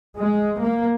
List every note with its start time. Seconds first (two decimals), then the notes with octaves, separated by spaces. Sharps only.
0.18 G#3
0.60 A#3